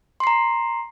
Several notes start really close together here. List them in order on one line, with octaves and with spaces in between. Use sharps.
C6 C7 A#5